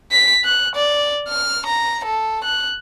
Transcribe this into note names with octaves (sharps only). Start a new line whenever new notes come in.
B6
F#6
D5
F6
A#5
A4
F#6